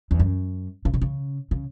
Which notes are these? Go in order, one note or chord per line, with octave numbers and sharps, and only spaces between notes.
E2
F#2
C#3
C3
C#3
C#3